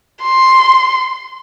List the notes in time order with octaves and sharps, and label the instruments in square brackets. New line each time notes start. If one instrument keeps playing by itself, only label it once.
[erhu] C6